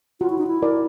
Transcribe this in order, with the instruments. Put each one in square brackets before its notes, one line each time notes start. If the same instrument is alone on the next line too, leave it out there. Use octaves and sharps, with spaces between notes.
[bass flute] F4 [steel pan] F#4
[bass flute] E4
D#4
E4
[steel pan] A#4 D5